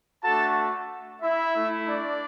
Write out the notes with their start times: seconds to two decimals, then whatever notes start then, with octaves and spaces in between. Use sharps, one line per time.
0.23 A3 D4 F#4 A4 A5
1.22 E4 E5
1.54 A3 E4
1.87 D4 D5